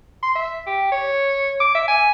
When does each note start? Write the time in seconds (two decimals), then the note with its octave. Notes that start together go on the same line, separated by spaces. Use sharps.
0.23 C6
0.35 E5
0.67 G4
0.92 C#5
1.60 D6
1.75 E5
1.88 G#5